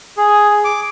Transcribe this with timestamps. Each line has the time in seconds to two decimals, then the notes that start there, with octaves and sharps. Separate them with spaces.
0.17 G#4
0.64 D6